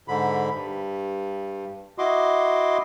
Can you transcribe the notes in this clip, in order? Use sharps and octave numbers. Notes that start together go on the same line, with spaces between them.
G#2 D3 B5
G2
E4 F#4 D#5 C6 D6